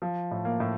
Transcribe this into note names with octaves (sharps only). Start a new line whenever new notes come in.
F3
A2
A#3
A2